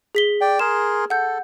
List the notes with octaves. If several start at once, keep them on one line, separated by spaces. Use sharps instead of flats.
G#4 B6 G7
D5 G5
G#4 A#4 C6 E7
A4 F#5 G6